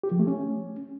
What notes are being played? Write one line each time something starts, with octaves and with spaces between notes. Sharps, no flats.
G4
F3
A3
C#4